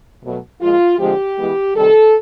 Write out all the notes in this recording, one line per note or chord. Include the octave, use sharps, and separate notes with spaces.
B2 F#3 A3
A#2 F3 G#3 F4
D3 F3 G#3 C4 G4
E3 G#3 B3
C3 D#3 G3 A4